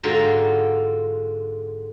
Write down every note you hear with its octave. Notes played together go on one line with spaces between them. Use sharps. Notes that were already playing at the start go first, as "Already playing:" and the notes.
G#2 D3 F4 F#4 G5 A#5